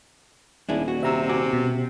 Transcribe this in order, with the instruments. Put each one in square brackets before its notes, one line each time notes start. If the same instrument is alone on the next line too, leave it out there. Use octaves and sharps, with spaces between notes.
[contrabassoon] D#1 [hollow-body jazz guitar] D4 E4 G#4
[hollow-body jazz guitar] F#4
[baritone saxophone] C3 [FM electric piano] E5 A#5 E6
[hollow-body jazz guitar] F#4 [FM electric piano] G#5 D6
[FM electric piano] B2